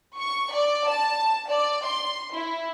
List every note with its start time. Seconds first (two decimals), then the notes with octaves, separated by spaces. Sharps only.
0.19 C#6
0.55 D5
0.89 A5
1.50 D5
1.86 C6
2.35 E4